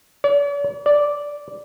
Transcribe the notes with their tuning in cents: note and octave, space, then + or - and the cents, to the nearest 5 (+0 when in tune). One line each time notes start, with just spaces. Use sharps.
D5 -45
D5 -5